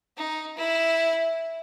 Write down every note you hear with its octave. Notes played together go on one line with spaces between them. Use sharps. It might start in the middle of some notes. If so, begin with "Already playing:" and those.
D#4
E4